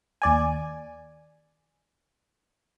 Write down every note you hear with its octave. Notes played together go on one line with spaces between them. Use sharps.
D#2 D5 G#5